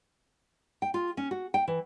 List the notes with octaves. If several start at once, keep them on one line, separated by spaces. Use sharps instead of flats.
G5
F4
C#4
F#4
G5
E3